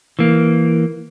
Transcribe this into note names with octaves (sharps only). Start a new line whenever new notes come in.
E3 A#3